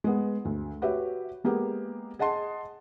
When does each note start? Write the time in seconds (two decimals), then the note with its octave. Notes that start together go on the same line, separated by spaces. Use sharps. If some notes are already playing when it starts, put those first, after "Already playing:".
0.04 G#3 B3
0.45 D2
0.82 F#4 G4 B4 C#5 E5
1.44 G#3 A#3 B3 G4 G#4
2.19 G#4 D#5 F#5 A5 C6